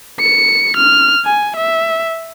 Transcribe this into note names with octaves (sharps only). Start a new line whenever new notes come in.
C#7
F6
G#5
E5